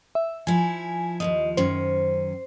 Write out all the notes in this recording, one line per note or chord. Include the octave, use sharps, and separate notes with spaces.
E5
F3 E4 G#5
D#2 G#2 F3 D#5
F#2 D#3 C#4 C5